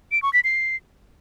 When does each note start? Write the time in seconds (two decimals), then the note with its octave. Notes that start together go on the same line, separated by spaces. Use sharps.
0.12 D7
0.22 C#6
0.33 B6
0.44 C7